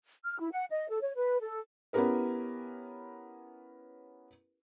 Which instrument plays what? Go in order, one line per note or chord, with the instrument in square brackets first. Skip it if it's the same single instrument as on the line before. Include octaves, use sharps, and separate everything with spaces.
[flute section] F6
E4
F#5
D#5
A4
C#5
B4
A4
[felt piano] B3 C#4 E4 G4 A#4 B4